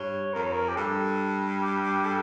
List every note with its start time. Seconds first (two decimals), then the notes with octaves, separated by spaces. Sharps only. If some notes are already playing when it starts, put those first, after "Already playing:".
Already playing: G2 C#5
0.34 F2 A#4
0.43 C#5
0.53 A#4
0.69 G4
0.76 G2 A4
1.62 G4
2.05 A4